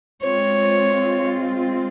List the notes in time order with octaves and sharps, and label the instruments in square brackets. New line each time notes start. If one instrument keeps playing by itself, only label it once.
[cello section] G#3 C4 F4 [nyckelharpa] C#5